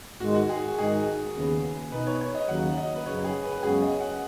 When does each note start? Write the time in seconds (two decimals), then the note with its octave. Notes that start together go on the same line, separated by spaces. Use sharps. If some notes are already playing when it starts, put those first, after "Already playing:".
0.20 G#2 D#3 G#3 F#4
0.35 F#4
0.50 G#4
0.78 G#2 D#3 G#3 D#4 G#4
1.35 D#2 C#3 B3
1.91 B2 B3 D#4 B4
2.07 C#5
2.21 C#5
2.35 D#5
2.48 D#2 C#3 F#3 D#4 F#5
2.77 D#5
2.95 B4
3.06 F#2 C#3 F#3 C#5
3.24 G#4
3.44 B4
3.62 F#2 C#3 G#3 B3 F#4 G#4
3.82 D#5
4.00 F#5